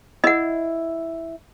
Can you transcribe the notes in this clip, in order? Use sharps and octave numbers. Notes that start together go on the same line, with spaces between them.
E4 D#5 F#5